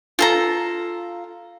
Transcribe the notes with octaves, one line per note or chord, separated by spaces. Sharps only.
F4 A4 A#5